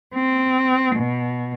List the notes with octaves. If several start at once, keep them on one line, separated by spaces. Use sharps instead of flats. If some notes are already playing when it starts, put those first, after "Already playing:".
C4
B2